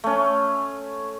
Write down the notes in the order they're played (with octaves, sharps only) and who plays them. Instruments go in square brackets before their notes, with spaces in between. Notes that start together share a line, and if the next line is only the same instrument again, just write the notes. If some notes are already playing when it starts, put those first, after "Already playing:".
[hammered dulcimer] A3 C#4